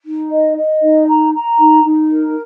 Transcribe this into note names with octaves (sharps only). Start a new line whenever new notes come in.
D#4
D#5
D#5
D#4
A#5
A#5
D#4
D#4
A#4